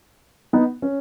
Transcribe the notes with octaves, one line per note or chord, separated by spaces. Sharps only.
B3 D#4
C#4